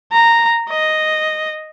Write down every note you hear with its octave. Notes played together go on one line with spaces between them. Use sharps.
A#5
D#5